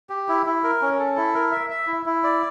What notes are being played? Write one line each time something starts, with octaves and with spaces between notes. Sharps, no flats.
G4
E4
E4
A#4
C#4
A4
E4
A#4
E5
E5
E4
E4
D5